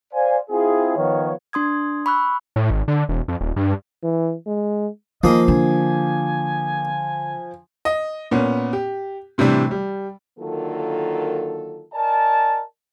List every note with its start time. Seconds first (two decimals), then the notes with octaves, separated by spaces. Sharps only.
0.14 C5 D5 F5 G#5
0.51 C4 E4 F4 G#4
0.96 D#3 F3 B3 C#5
1.53 D4 C6 D#6 G#6
2.06 B5 C#6 E6 F#6
2.56 A2
2.71 G#1
2.88 D3
3.09 E1
3.28 F2
3.41 D#1
3.56 G2
4.03 E3
4.47 G#3
5.23 D#3 F3 A#3 G#4 D#5
5.48 D3 G#5
7.85 D#5
8.31 A#2 B3 C#4
8.73 G4
9.38 A2 C3 E3 G3 D4
9.71 G3
10.38 D3 D#3 F#3 A#3 F4 A4
11.92 A#4 D5 D#5 G#5 A5